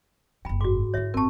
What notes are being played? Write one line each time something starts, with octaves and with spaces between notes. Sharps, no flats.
F#1 C3 G5 B5
G#2 F#4 D6
D3 E4 C#5 E5
G1 C4 A#4 A5 C#6